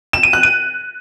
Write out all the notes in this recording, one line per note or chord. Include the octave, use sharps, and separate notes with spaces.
E7
D#7
F#6
D#7